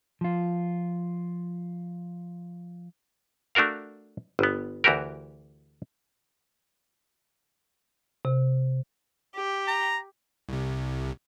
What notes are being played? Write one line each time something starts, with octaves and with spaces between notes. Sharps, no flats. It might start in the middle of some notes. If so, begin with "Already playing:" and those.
F3 F4
A3 D4 F#4 A#4 F5
G1 B3
D2 E3 F#4 G4 A#4
C3
G4
A#5
C2 C3